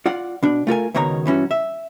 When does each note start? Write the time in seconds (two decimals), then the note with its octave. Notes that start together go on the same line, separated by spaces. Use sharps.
0.06 F4 D5 F#5
0.43 B2 D4
0.67 A3 F4 A#4 G#5
0.94 C#2 B2 D#3 C#5 A#5
1.26 G2 E3 C#4 F#4
1.51 E5